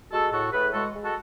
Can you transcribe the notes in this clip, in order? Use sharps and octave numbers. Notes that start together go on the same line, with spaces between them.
G#3 F#4 A4
A2 F#4 A4
A2 G#4 B4
G#3 F#4 A4
G#3
F#4 A4